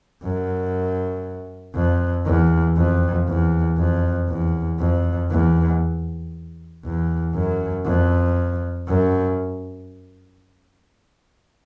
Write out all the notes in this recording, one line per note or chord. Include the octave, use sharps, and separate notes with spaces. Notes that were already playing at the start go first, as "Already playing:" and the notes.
F#2
F2
E2
F2
E2
F2
E2
F2
E2
E2
F#2
F2
F#2